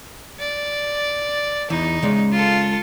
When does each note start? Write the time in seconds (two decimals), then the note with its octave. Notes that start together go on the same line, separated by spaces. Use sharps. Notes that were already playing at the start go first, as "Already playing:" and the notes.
0.39 D5
1.70 E2 E3 D#4
2.02 C#3 G#3 D5
2.32 F4 A4